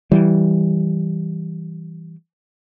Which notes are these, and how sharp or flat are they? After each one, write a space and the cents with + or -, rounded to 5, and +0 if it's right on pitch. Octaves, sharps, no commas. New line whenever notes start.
E3 -10 G3 -10